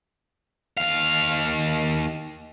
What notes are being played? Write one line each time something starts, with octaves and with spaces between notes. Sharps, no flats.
D#2 F5